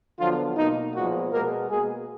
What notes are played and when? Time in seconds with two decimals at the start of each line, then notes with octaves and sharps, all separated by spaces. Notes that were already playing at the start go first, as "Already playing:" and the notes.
0.20 D3 F3 F#3 B3 F4
0.57 B2 A#3 D#4
0.96 A#2 F3 F#3 G#3 B3 F#4
1.33 B2 G#3 A#3 B3 A#4
1.70 B2 G#3 A#3 G#4